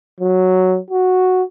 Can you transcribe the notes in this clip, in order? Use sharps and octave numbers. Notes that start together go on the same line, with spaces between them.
F#3
F#4